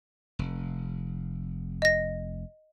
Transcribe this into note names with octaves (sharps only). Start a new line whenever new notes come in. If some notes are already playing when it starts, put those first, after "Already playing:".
F1
D#5 A#6